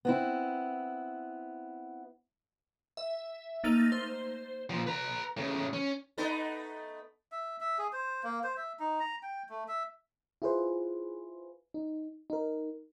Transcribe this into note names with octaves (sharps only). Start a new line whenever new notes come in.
B3 C4 E4
E5
A3 A#3 D#4 A6 F7
C5
A#2 F3
B4 A#5
A2 C#3
C#4
A3 B3 D#4
E5
E5
G#4
C5
A#3
C5
E5
D#4
A#5
G5
A3
E5
E4 F4 G#4 B4 C5
D#4
D#4 A#4